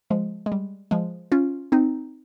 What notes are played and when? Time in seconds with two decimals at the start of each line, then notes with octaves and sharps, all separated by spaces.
0.10 F3 G#3
0.46 G#3
0.52 G3
0.91 F3 G#3
1.32 C#4 F4
1.72 C4 D#4